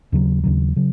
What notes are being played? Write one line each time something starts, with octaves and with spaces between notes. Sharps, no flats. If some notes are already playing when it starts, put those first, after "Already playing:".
D#2 C#3 F#3
D#2 C#3 F#3
C#3 F#3